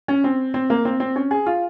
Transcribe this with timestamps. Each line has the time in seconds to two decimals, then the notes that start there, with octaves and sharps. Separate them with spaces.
0.08 C#4
0.24 C4
0.54 C4
0.70 A#3
0.85 C4
1.00 C4
1.16 C#4
1.31 G#4
1.46 F4